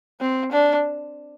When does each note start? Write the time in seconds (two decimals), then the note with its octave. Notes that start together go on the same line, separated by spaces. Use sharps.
0.21 C4
0.52 D4